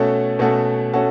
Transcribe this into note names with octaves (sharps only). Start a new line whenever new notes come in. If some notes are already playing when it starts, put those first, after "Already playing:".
Already playing: B2 A3 C#4 F#4 A4
B2 A3 C#4 F#4 A4
A3 C#4 F#4 A4